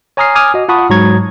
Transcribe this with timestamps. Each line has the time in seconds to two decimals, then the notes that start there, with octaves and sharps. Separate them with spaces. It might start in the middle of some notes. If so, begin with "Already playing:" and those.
0.17 C#5 G#5 A#5 D#6 F6 C7
0.35 G#5 D6 D#6 F6
0.54 F#4 D#5
0.69 F4 F#5 A5 B5 C#6 D#6
0.90 G#2 F#3 G#3 A#5 C#6 G#6